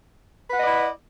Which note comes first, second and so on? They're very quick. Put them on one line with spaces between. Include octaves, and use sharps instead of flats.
B4 F#5 D#5 D5 E4